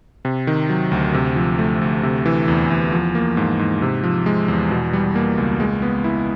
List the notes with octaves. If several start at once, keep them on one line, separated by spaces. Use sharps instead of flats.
C3
D#3
F#3
D2
C3
F3
A3
D2
C3
E3
E2
E2
F3
A#3
G#2
G#2
C3
F3
G#3
E2
B2
G3
A#3
C#2
G#3
B3
E4